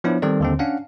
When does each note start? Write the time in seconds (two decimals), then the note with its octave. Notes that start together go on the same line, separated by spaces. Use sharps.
0.04 F3 B3 D4 E4 C#5
0.22 D#3 G3 C4 A4 D5
0.40 D#2 D3 C4
0.59 C#4 D4 F5 F#5